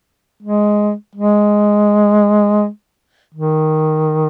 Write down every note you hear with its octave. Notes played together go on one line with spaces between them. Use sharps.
G#3
G#3
D#3